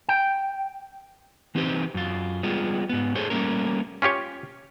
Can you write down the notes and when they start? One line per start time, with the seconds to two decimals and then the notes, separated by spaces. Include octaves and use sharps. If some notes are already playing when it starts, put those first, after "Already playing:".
0.09 G5
1.55 E3 C4 D#4 G4 B4 C5
1.94 F#2 F4
2.43 G3 G#3 B3 F4
2.89 G#2 B3
3.15 G#4 A4 C5 C#5
3.30 G3 A3 A#3 C#4 A#4
4.02 C#4 F4 G4 C#5